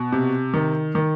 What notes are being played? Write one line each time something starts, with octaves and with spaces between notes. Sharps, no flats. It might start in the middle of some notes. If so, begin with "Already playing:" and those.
Already playing: B2
C3
D#3
D#3